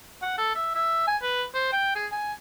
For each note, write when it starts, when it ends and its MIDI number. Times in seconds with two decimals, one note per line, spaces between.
0.22 0.34 78
0.38 0.51 69
0.55 0.74 76
0.75 1.07 76
1.07 1.17 80
1.22 1.43 71
1.54 1.71 72
1.72 1.91 79
1.95 2.06 68
2.12 2.33 80